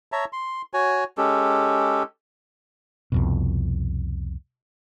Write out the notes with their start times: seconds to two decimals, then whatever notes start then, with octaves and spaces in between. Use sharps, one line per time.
0.12 C#5 E5 A5 A#5
0.33 C6
0.74 F#4 C#5 G#5
1.18 G#3 C#4 G4 A4
3.12 C2 F2 B2